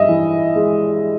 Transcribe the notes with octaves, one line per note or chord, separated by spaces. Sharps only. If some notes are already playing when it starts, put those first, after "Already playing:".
Already playing: G2 D#5 E5
E3
G#3